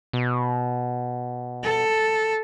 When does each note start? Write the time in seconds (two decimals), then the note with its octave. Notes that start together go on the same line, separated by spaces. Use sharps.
0.13 B2
1.64 A4